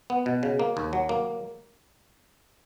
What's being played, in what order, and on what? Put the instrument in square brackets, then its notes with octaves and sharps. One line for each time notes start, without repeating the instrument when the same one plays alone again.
[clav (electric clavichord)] B3
B2
C#3
A#3
D#2
F#3
A#3